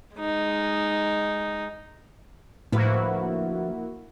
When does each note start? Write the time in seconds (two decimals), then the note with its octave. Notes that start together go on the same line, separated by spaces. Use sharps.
0.17 G#3 D#4
2.72 D2 A2 F3 A#3 E4 F#4 B4